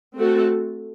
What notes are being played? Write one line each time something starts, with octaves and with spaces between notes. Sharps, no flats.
A3 C4 F#4 A4